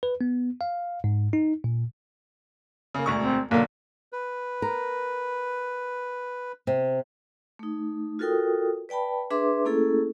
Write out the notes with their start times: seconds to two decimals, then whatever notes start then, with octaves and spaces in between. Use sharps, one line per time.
0.03 B4
0.21 B3
0.61 F5
1.04 G#2
1.33 D#4
1.64 A#2
2.94 C#3 A#3
3.06 E1 D2 C#6
3.22 C4
3.51 B1 D3 A#3
4.13 B4
4.62 A#4
6.67 C3
7.59 A3 D#4
8.19 F4 F#4 A4 A#4 G5 D#6
8.89 B4 D5 G5 A5 B5
9.30 D4 G#4 B4 E5 C6 D6
9.65 A3 A#3 C#4 E4 G#4 A4